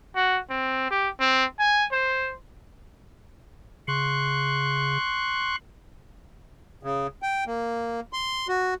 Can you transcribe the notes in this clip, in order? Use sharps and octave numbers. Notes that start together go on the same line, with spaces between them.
F#4
C4
G4
C4
G#5
C5
C#3 C6 C#6 F#6
C#3
G5
A#3
C6
F#4